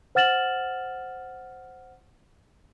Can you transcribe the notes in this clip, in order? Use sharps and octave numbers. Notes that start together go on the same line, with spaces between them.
C5 F#5 F6 A6 E7 F#7